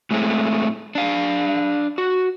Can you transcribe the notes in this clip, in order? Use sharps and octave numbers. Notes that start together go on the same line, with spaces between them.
A2 G#3 A3 C4
D4 F5
F#4